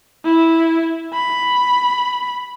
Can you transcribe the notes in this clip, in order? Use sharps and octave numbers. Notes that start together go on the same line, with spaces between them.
E4
B5